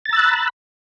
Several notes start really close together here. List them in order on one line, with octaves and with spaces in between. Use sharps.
A6 A#5 E6 F#6 B5